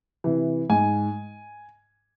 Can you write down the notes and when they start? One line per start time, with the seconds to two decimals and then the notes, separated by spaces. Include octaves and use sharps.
0.24 C3 E3
0.70 G#2 G#5